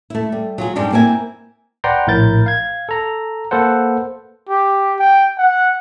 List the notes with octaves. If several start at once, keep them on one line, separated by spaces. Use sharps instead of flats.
A3 E4
G3
F#3 F4 G#4
G2 G3 G#3 C4 D4 D#4
A#3 C4 E4 G#5
B4 D5 F#5 G5 A#5 C6
A#1 A2 E4 A#4 G6 A6
F5 G#6
A4 A#5
A#3 A4 B4 C5 F#5
G4
G5
F#5